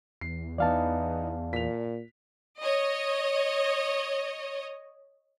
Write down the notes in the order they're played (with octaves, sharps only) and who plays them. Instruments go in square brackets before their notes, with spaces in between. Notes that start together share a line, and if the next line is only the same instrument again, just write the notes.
[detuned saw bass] E2 [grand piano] C7
[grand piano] E3 B3 D#4 [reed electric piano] D5 F5 A5
[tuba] A#2 [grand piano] B6 F7
[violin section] C#5 D#5